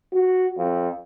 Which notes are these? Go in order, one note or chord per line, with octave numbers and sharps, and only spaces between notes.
F#4
F2